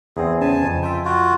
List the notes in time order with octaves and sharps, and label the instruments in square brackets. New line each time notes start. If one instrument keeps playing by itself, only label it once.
[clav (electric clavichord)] E2 C4 [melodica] G#4
[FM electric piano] C#3 [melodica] G#5 A5
[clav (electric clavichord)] F2
[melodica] F4 [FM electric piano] E5 G5
[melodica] F4 F#4